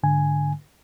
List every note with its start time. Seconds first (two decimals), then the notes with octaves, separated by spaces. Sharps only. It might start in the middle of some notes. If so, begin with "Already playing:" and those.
0.03 G#2 D3 G#5